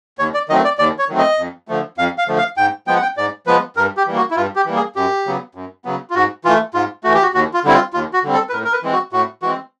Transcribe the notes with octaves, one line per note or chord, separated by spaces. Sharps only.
D#2 C#5
D5
D#3 F#3 A3 C4 D#5
D5
D#2 D5
C#5
D#3 F#3 A3 C4
D#5
F2
D3 F3 A3
F2 F5
F5
D3 F3 A3
F5
G#2 G5
F3 G#3 B3 G5
F#5
G5
G#2 D5
F3 G#3 B3 B4
G2 A#4
G4
E3 G3 A#3
F#4
E4
G2 F4
G4
E3 G3 A#3
G#4
F#2 G4
C#3 F#3 B3
F#2
C#3 F#3 B3
F4
G#2 F#4
E3 A3 F4
G#2 F4
E3 A3 F#4
G4
F#4
D#2 F#4
F4
D3 G3 C4 E4
F4
D#2 F4
F#4
D3 G3 C4
A4
B4
A2 A#4
A#4
B4
E3 G#3 C4
F#4
A2 F#4
E3 G#3 C4 F#4